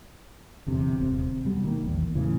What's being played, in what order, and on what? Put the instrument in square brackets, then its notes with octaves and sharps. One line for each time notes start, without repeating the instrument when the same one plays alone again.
[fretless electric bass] G1 E2 C3
D#1 C3
B2 G3
D#3 A#3
A#1 E2
A2 C#3 E3